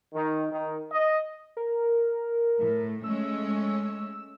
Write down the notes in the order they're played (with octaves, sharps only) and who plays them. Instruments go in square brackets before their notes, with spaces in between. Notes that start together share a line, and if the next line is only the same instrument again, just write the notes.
[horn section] D#3
D#3
D#5
[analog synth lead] A#4
[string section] A2
[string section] G#3 A3 C#4 [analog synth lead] E6